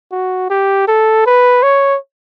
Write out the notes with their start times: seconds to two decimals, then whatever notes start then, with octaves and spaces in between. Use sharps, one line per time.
0.12 F#4
0.50 G4
0.88 A4
1.26 B4
1.63 C#5